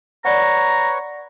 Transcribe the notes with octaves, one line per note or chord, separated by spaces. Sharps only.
B4 C#5 D5 F#5 A#5 C#6